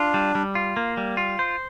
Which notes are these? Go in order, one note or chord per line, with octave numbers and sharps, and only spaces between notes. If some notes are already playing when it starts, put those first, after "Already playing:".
Already playing: D4 F4
G3
G3
F4
A#3
G3
F4
C5